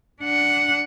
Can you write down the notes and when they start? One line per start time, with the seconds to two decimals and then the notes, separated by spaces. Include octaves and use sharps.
0.20 D4 F#5